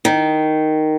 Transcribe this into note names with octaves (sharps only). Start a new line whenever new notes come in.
D#3